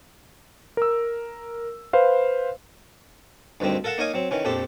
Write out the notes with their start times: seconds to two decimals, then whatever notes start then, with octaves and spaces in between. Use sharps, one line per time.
0.77 A#4 E6
1.93 B4 C5 F5
3.60 D2 G2 D#3 G3 C4
3.84 A4 A#4 F5 F#5 A5
3.98 A#3 D#4 C#5 D#5 F5 G#5
4.14 F#3 C4
4.31 D#3 E3 C#4
4.45 A#1 F2 G4 A4 C5